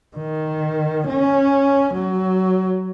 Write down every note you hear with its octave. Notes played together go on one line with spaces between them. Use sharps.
D#3
C#4
F#3